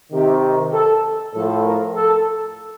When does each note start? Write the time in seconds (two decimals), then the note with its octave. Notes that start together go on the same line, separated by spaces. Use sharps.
0.12 C3 D#3 G4
0.73 A4
1.34 A2 F3 A4
1.64 A#4
1.95 A4